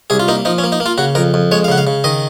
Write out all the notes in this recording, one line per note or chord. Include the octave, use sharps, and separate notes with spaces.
C2 G#4
F4
A#3 D#4
F3 D#4
C#4
A#3
D#4
A#3
F4
C#3 F#4
F2 A#4
F2
G#3 C#5
F5
C#3 F#5
F5
C#3
D#3 D#5